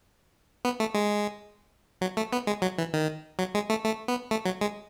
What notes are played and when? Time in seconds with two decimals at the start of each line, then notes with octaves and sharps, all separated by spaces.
0.65 B3
0.80 A3
0.94 G#3
2.01 F#3
2.17 A3
2.33 B3
2.47 G#3
2.62 F#3
2.78 E3
2.94 D#3
3.39 F#3
3.55 G#3
3.70 A3
3.85 A3
4.08 B3
4.31 A3
4.45 F#3
4.61 G#3